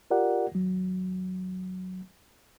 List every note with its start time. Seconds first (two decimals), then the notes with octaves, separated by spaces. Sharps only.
0.11 F4 G4 A#4 D5 F#5
0.52 D#2 F#3